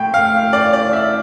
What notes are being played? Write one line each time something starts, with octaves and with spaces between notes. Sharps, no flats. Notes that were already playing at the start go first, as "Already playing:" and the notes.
Already playing: A2 G5
F5
D5
D5
E5